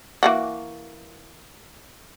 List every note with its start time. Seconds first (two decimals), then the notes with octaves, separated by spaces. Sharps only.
0.23 E3 A#3 F#4